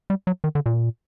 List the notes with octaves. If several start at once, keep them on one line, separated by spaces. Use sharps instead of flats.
G3
F#3
D#3
D3
A#2